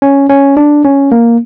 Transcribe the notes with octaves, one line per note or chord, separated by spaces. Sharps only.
C#4
C#4
D4
C#4
A#3